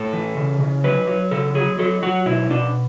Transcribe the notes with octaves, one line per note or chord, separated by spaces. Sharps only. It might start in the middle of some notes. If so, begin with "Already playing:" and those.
Already playing: A2 A4
E3
C#3
C#3
F#3 B4
F#3
C#3 A4
F#3 G#4
F#3 A4
F#3 F#4
B2 E4
B2 D4